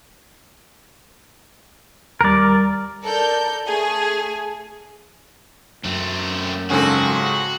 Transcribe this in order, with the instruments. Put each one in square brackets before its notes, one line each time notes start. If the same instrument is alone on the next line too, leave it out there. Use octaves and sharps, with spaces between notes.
[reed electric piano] D#2 G3 [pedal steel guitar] A#4 D5
[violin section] A4 A#4 D5 G6
A3 G#4 G#5
[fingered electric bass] F#2 [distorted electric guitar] A3 C4
[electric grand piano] G#2 C#3 G#5 [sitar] F3 C4 A4 [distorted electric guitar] F#4